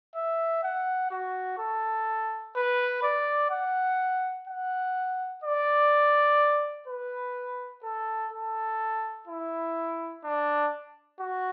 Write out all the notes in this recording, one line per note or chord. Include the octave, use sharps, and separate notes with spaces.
E5
F#5
F#4
A4
B4
D5
F#5
F#5
D5
B4
A4
A4
E4
D4
F#4